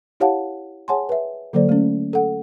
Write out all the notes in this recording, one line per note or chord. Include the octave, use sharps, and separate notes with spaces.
E4 G4 C#5 F5 F#5 A5
G#4 C#5 F#5 G#5 A5 C6
B4 E5
D3 F#3 A#3 A4 C5 D5
A3 C#4
A4 F#5